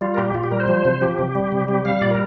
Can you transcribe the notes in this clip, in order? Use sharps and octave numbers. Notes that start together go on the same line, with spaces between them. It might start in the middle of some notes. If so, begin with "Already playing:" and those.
G3 F4
A#4
A#2 G4
A#2 F4
G4
G3 A#4
C5
F3
C3
F3 G4
C3
G3
C3
G3 G4
G3 F5
A#2 D5
A#4